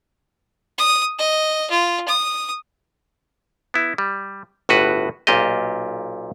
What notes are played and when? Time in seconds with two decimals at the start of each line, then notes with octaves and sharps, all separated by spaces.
0.78 D#6
1.19 D#5
1.70 F4
2.08 D#6
3.74 B3 E4
3.98 G3
4.69 G1 A2 F#4 B4
5.27 B1 A#2 F4 G4 D#5